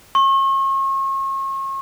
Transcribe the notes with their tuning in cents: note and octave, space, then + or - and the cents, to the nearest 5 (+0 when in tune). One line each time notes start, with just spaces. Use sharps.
C#6 -40